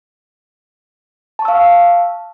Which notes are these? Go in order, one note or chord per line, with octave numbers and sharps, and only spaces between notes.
F5 A5 C#6 E6